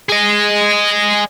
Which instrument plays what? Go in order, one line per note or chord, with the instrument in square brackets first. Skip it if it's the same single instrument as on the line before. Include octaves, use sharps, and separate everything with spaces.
[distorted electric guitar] G#4 D#5